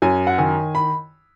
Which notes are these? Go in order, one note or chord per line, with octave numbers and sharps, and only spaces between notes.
F#2 G#5
F#5
D#3 G#5
B5